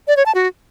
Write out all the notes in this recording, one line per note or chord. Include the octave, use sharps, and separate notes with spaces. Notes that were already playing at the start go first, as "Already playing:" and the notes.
D5
C#5
A5
F#4